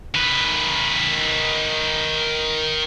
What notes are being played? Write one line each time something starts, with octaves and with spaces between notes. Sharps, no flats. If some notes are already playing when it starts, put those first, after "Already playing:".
D#3 B4